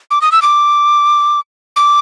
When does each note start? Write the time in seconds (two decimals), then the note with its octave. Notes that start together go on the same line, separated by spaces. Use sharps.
0.11 D6
0.21 D#6
0.32 E6
0.42 D6
1.76 D6